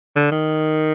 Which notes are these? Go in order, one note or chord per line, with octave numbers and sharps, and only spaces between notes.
D3
D#3